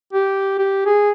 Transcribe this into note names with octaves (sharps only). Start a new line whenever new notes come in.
G4
G4
G#4